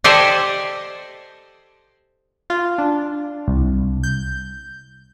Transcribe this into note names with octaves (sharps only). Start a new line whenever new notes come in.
G4 A4 C5 D5 D#5 G#5
F4
D4
C2
G6